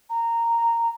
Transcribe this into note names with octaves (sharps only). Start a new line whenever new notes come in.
A#5